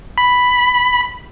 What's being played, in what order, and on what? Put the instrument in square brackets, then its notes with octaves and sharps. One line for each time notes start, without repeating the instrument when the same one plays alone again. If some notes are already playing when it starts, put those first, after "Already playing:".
[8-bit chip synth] B5